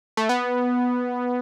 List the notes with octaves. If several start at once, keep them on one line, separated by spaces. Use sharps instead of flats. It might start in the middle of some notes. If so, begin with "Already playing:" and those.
A3
B3